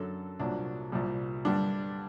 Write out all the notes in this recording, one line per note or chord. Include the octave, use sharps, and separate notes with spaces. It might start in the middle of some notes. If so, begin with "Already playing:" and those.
Already playing: F#2 D3 F#3 A4
C2 A#2 F#3 D4
C2 A#2 G3
G2 D3 G3 D4